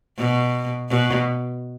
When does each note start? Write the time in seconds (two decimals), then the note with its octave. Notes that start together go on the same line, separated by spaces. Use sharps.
0.18 B2
0.90 B2